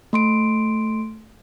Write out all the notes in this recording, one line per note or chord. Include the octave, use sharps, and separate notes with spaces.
A3 C6 D7